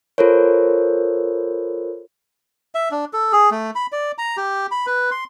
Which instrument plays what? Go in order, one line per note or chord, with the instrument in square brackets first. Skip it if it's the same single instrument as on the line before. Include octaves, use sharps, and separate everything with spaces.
[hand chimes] F4 A4 A#4 C5 C#5
[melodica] E5
D4
A4
G#4
A3
B5
D5
A#5
G4
B5
B4
C6